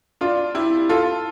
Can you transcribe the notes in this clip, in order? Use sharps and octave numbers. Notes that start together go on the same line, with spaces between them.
D4 F4
E4 G4
F4 A4